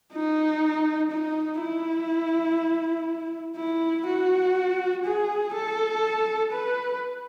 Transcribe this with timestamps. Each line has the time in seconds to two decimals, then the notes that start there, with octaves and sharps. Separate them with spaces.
0.13 D#4
1.11 D#4
1.60 E4
3.56 E4
4.07 F#4
5.05 G#4
5.54 A4
6.52 B4